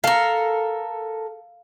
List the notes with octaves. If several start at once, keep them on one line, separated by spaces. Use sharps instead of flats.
A4 A#4 F5